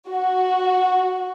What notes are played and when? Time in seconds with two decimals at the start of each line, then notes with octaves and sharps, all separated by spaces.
0.10 F#4